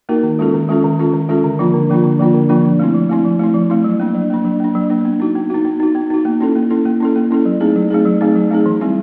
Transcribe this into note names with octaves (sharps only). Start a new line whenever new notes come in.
A#3 D#4 F#4 A#4
D#3
G#3 C#4 F4 A4
D#3
G#3 C#4 F4 A4
D#3
G#3 C#4 F4 A4
D#3
G#3 C#4 F4 A4
D3
F3 A#3 D4 F4
D3
F3 A#3 D4 F4
D3
F3 A#3 D4 F4
D3
F3 A#3 D4 F4
F3
A3 C4 E4
F3
A3 C4 E4
F3
A3 C4 E4
F3
A3 C4 E4
F#3
A#3 D4
F#3
A#3 D4
F#3
A#3 D4
F#3
A#3 D4
B3
D#4 F#4
B3
D#4 F#4
B3
D#4 F#4
B3
D#4 F#4
A#3
C#4 E4 A4
A#3
C#4 E4 A4
A#3
C#4 E4 A4
A#3
C#4 E4 A4
F#3
A3 C4 D#4 G#4
F#3
A3 C4 D#4 G#4
F#3
A3 C4 D#4 G#4
F#3
A3 C4 D#4 G#4
E3
G3 C4 E4